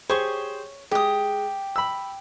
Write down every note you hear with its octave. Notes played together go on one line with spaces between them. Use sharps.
G4 G#4 C5 C#5 C#6
G#3 G4 D#6
B5 E6